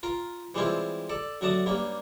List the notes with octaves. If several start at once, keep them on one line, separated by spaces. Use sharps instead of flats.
F4 A#4
E3 G3 G#3 C4 E4 F4
A4 D5
F#2 A3 F#4 D5 A5 D#6
G2 G3 A#3 C#4